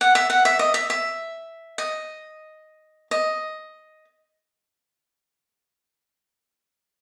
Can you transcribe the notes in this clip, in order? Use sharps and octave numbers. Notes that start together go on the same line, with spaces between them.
F#5
E5
F#5
E5
D#5
E5
E5
D#5
D#5